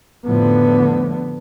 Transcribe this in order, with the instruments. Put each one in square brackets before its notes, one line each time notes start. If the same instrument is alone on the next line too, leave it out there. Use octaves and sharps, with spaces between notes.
[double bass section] F2 A2 F3 [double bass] D3 B3